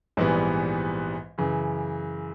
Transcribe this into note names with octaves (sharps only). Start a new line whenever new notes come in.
A#1 G#2 E3 G3 B3
F#2 C#3 E3